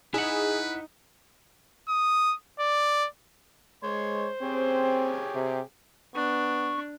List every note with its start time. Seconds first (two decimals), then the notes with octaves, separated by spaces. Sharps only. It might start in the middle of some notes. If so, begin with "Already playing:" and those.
0.14 D#4 E4 G#4 B4 F#5
1.89 D#6
2.60 D5
3.83 G#3 C5 C#5 C6
4.41 C4 G4 G#4 C#5
5.35 C3
6.15 B3 D4 C#6